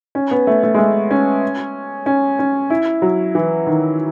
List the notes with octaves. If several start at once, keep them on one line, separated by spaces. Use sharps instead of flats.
C#4
B3
A3
A3
G#3
A3
C#4
C#4
C#4
E4
F#3
E3
D#3